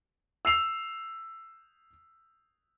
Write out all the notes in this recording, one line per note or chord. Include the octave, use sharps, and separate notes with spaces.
E6 C7 F7